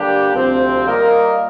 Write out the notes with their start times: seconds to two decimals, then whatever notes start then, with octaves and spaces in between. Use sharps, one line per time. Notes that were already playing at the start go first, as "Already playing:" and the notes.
Already playing: D3 G3 A#3 D4 G4
0.33 D2 C3 F3 C4
0.86 G3 A#3 F4 A#4 D#5